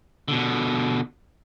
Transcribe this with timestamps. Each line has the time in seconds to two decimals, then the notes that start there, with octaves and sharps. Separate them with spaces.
0.28 B2 D3